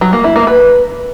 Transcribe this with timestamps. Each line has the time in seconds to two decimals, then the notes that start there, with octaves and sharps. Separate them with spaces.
0.01 F#3
0.13 A#3
0.24 E4
0.36 A#3
0.47 B4